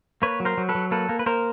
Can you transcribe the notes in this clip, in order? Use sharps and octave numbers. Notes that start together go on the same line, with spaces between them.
A#3 B4 C#5
F#3
A#4 C5
F#3
A4 B4
F#3
A#3 A4 B4
A#3
B4
A#3 A#4 C5